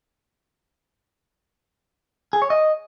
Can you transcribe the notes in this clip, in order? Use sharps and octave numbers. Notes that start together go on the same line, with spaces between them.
G#4
C#5
D#5